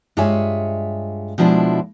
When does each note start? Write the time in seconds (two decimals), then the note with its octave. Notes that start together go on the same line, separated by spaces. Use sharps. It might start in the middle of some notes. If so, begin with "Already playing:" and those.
0.17 G2 G#3 F4 C#5 E5 G#5
1.38 B2 F3 G#3 D4 E4